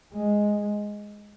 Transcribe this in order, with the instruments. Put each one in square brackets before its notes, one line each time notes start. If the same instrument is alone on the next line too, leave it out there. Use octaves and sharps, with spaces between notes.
[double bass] G#3